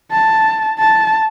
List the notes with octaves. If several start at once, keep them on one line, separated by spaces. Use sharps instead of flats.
A5
A5